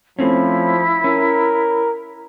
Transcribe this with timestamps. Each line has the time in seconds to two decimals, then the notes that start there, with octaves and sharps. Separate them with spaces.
0.19 F3 A3 C4 C#4 E4
1.04 C#4 A#4